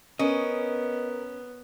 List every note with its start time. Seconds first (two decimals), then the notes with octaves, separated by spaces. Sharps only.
0.19 B3 C#4 A#4 D#5